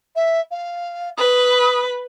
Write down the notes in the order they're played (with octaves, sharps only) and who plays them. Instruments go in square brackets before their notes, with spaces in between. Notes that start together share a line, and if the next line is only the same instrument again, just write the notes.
[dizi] E5
F5
[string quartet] B4 [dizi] D#6